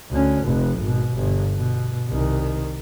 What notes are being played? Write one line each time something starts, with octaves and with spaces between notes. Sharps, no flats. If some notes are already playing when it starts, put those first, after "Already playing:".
D2 C#4
F1 F2
G#1 B2
G1
B2
C2 D#3